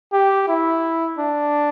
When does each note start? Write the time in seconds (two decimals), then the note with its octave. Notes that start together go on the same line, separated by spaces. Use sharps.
0.13 G4
0.48 E4
1.19 D4